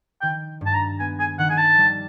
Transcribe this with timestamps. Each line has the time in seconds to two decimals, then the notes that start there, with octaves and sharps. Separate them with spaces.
0.21 D#3 G5
0.61 G2
0.66 A5
0.74 A#5
1.00 B3 G#5
1.20 G#5
1.39 D#3 F#5
1.50 G#5
1.58 A5
1.78 G3